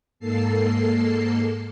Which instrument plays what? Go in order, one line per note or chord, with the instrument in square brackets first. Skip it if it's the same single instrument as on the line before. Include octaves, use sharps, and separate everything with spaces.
[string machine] G#2 A#3 A4 A5 C7